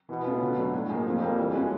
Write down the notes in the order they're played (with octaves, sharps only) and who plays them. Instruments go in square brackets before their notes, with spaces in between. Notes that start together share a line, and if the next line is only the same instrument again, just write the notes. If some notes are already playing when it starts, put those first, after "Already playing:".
[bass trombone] B2 [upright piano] E3
[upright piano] A3 C#4 F4
D3
F#3 A3 D4 F#4
A2
F3 A#3 D#4 G#4
[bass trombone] F2 [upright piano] A#2
[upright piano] G3 A#3
E3
G#3 C#4 F#4